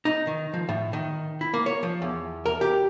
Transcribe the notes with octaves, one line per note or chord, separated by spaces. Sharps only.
D#4
D#3
F3
A2
D#3
E4
A#3
C#5
F3
E2
A#4
G4